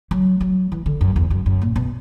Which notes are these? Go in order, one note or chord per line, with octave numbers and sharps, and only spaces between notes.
F#3
F#3
E3
D3
F#2
E2
F#2
F#2
A#2
B2